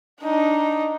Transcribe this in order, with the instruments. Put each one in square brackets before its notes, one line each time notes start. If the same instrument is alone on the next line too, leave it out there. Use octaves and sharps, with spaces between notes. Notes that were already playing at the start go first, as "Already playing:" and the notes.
[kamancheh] D4 D#4